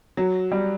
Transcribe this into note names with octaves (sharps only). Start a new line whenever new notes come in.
F#3
G3